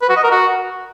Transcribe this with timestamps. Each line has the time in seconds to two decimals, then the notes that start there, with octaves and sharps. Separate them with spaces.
0.02 B4
0.09 F#4
0.16 D#5
0.24 A#4
0.31 F#4